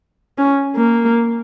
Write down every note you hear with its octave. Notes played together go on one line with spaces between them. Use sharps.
C#4
A#3